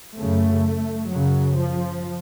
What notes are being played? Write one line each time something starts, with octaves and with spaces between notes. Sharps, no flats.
F#2 C#3 A3
F#2 C#3 F#3
F3